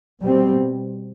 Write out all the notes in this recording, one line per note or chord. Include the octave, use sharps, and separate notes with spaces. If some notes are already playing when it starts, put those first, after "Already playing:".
B2 G3 C4